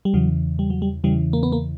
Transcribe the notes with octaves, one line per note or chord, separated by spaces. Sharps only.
G3
E2 C#3 E3 F#3
G3
F#3
G3
E2 C#3 E3 G3
A#3
B3
A#3